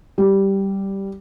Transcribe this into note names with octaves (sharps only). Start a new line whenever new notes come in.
G3